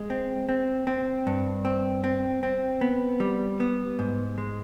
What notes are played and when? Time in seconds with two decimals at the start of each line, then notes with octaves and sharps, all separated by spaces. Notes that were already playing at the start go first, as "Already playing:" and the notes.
Already playing: G#3
0.10 C4
0.49 C4
0.87 C4
1.27 G2
1.65 C4
2.04 C4
2.43 C4
2.81 B3
3.20 G3
3.60 B3
3.99 G#2
4.38 G#3